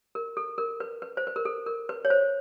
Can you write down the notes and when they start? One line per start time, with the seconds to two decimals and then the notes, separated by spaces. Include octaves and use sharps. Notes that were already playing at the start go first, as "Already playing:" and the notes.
0.15 A#4
0.37 A4
0.58 A#4
0.80 B4
1.02 B4
1.17 C5
1.27 B4
1.36 A#4
1.45 A4
1.66 A#4
1.89 B4
2.05 C#5
2.10 C5